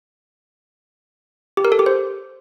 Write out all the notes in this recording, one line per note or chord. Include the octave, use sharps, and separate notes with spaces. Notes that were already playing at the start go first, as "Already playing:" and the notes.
G4
A#4
A4
G4
C5